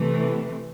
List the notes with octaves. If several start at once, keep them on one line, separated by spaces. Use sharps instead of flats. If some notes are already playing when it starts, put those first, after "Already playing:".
Already playing: C3 E3 A3